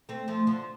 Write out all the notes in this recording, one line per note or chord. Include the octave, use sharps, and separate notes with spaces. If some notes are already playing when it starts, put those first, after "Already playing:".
A3 C4
F3 A3
D3 F3